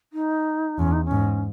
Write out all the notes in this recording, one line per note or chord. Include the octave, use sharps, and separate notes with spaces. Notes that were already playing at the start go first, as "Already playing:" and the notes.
D#4
E2 C#4
D#4
C#4
G#2